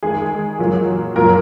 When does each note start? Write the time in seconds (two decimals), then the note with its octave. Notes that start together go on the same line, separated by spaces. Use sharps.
0.03 D#3 G#3 G#4
0.59 A#2 F#3 A#3
1.16 A#2 F#3 A#3 A#4